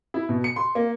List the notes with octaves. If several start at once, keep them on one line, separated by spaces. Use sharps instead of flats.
E4
B2
C#7
C6
A#3